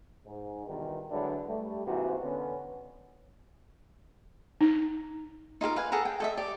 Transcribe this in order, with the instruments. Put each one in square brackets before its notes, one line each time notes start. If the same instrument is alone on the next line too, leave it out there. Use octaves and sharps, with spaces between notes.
[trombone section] G#2
E2 G2 B2 D#3
D3 F#3 G#3 D4 E4 B4
G3 A3
G#2 C3 E3 A#3 F#4
D3 B3 C#4
[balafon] D#4
[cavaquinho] D#4 F4 A4 A#4
B4 F5 G#5
G#4 A4 F#5 A#5
G5
A4 D#5 E5
G4 D5